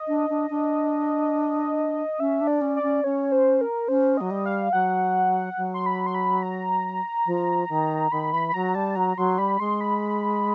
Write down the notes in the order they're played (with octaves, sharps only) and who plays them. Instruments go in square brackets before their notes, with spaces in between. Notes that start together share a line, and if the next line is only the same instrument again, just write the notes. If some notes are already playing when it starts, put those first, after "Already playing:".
Already playing: [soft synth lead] D#5
[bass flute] D4
D4
D4
[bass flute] C#4 [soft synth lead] E5
[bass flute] D4
[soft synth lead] D5
[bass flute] C#4
[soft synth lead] D5
[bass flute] C#4
[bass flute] C#4 [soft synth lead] C#5
[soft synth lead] C5
A#4
[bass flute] C#4 [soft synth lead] C5
[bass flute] F#3 [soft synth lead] D#5
[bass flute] G3
[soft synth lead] F5
[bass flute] F#3 [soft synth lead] F#5
[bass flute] F#3
[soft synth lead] C6
B5
C6
B5
A#5
[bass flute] F3
D#3
[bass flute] D#3 [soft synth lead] B5
[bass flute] E3 [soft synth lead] B5
[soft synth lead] B5
[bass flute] F#3 [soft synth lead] A#5
[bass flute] G3 [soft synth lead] A5
[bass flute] F#3 [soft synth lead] A#5
[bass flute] F#3 [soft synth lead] C6
[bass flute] G3 [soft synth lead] B5
[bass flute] G#3 [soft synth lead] C6
[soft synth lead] B5